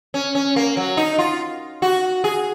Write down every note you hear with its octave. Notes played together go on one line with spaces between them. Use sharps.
C#4
C#4
A#3
F#3
D#4
F4
F#4
G#4